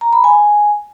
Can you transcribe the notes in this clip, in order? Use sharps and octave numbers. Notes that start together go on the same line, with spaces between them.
A#5
B5
G#5